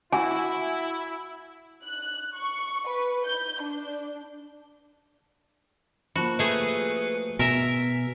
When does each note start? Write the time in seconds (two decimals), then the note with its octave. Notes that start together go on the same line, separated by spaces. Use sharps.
0.12 E4 F#4 G#5
1.84 F#6
2.35 C#6
2.86 B4
3.25 G6
3.61 D4
6.16 F3 A#3 F#4 A5 B5
6.39 A3 G#4 B4 C#7
7.39 B2 A#4 E5 G#5 B6